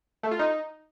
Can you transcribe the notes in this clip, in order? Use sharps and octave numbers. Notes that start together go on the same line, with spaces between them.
A3
F4
D#4